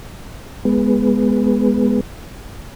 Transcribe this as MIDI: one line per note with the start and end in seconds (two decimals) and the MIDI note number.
0.65 2.00 56
0.65 2.00 59